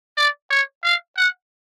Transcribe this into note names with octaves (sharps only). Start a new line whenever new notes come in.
D5
C#5
F5
F#5